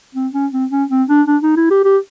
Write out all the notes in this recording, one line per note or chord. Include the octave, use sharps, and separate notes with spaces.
C4
C#4
C4
C#4
C4
D4
D4
D#4
E4
G4
G4